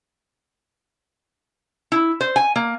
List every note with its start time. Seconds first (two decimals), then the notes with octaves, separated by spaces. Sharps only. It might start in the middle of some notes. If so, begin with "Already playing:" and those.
1.92 E4
2.21 C5
2.36 G#5
2.56 A#3